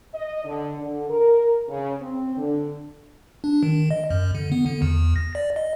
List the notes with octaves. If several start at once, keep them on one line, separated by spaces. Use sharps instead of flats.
D#5
D3
D3
A#4
C#3
C4
D3
D4
D#3
D#5
F#2
D3
B3
D3
E2
A#6
D5
D#5